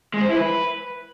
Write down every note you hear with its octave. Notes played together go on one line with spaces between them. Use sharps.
G#3
C5
E4
B4